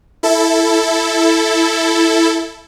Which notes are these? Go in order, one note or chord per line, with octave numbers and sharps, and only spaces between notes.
E4 A4